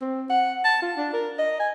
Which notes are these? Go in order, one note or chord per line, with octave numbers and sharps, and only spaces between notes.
C4
F#5
A5
F4
D4
A#4
D#5
G#5